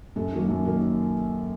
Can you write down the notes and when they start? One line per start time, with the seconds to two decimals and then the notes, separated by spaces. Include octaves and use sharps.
0.16 F#2 A4
0.32 D#3 F#3 A#3
0.49 F#2
0.65 D#3 F#3 A#3